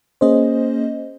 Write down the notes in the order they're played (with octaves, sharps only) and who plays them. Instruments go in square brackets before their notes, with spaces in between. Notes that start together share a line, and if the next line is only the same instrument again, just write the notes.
[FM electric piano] A#3 C#4 G#4 C5 D#5